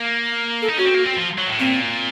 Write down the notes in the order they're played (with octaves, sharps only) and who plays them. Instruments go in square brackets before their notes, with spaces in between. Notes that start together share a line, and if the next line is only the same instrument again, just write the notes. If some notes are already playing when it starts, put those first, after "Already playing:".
Already playing: [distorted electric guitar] A#3
[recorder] A4
[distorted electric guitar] D#4
[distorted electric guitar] C#4 [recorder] F#4
[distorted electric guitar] C4
A#3
C4
F3
F#3
A2
[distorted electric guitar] A#2 [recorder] C4